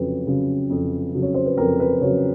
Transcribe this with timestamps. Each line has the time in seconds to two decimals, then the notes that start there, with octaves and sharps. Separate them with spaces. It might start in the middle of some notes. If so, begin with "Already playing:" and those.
Already playing: F2 C#3 F#3 B4
0.27 C#3 F#3
0.70 F2
1.15 C#3 F#3
1.22 C#5
1.34 C5
1.46 B4
1.58 F2 A#4
1.80 B4
2.01 C#3 F#3 C#5